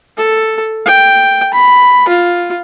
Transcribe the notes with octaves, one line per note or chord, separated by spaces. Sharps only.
A4
G5
B5
F4